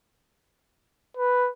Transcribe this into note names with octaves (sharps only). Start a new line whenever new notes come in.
B4